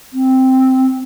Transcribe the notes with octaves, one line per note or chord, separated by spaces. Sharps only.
C4